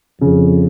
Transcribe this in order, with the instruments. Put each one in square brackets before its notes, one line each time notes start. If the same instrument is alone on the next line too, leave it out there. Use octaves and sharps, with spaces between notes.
[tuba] F2 [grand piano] C#3